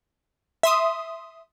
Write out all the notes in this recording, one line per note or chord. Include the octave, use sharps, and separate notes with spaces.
E5 C6 D#6